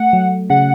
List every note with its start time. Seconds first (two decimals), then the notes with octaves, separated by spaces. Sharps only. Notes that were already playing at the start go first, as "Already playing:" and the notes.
Already playing: A3 F#5
0.13 F#3
0.50 C#3 F#5